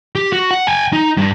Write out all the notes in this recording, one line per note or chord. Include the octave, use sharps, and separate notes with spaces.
G4
F#4
F#5
G5 G#5
D#4
G2